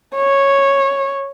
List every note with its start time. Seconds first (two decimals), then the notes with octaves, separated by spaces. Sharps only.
0.16 C#5